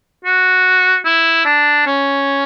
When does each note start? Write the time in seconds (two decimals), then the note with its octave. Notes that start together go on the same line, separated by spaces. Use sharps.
0.25 F#4
1.05 E4
1.45 D4
1.86 C#4